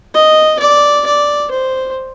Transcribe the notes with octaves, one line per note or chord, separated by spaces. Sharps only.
D#5
D5
D5
C5